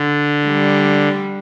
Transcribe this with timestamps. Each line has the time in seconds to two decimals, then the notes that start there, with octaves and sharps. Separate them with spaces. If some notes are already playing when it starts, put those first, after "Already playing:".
Already playing: D3
0.46 G3